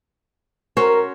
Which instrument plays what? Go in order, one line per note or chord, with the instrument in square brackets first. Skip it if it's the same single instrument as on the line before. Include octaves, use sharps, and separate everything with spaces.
[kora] C#4 F#4 C5 [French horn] A#4